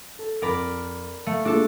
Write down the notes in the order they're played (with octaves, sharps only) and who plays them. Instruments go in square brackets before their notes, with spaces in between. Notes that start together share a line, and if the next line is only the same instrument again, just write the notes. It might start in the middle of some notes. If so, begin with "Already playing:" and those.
[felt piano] A4
[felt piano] F2 [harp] A#4 D5 B5
[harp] A3 [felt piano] F5
[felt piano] G#3 A#3 F4 [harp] D4 A4